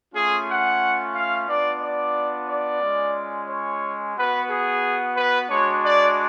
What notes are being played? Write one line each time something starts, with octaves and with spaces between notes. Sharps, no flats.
A3 C#4 F4 G#4
F#5
F5
B3 D4 F4 D5
D5
D5
G#3 C#4 F4
C#5
B3 F#4 B4
G#4
B4
G#3 D4 F#4 C#5
D5